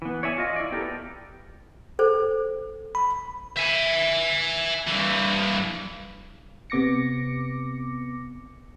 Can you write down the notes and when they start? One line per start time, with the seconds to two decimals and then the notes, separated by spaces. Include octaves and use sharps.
0.02 E3 B3
0.23 C#5 D5 E5 G#5
0.38 F4 D#5
0.56 E4 D5
0.72 B3 G4 A4 A#4
1.99 A4 C5
2.95 B5
3.57 E5 G#5
4.88 G2 E3
6.70 C3 B3 D6 A#6 C#7